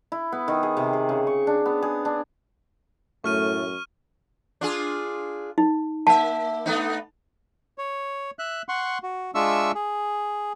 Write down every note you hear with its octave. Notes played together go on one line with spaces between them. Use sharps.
E4
B3
D#3
G#4
C3
G#4
C#3
C#6
D4
B3
G#4
D4
F#2 A2 A3 C#6 F6 D#7
D4 F4 G#4
D#4
A#3 E5 A5
A3 B3 D#4
C#5
E5 F#6
F#5 C6 C#6
F#4
G#3 D4 F4 E5 C#6 E6
G#4